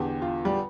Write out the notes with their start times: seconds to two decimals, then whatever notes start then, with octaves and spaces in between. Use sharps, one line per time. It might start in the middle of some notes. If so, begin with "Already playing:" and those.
Already playing: E2 D3 G4
0.22 F4
0.45 G3